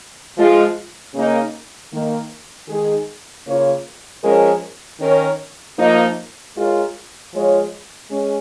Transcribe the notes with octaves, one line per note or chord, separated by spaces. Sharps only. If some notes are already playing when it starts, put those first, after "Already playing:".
F3 G#3 F4
C#3 A#3 D#4
D#3 A#3 D#4
D#3 G#3 D#4 G#4
C#3 A#3 F4 C#5
F3 G#3 C#4 A#4
D#3 C#4 A#4 C#5
F3 A#3 D#4
G#3 F4 A#4 C#5
F3 G#3 F4 C#5
G#3 C#4